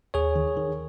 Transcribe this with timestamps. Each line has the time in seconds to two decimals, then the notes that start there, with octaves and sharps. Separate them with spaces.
0.14 D#2 G#4 C#5
0.36 D#3
0.57 D#3